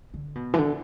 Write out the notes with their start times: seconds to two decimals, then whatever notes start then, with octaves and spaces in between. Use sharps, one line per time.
0.14 D3
0.35 B2
0.54 E3
0.58 D3